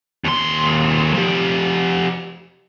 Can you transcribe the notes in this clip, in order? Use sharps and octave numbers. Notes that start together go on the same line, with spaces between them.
D#2 C6
F3 G4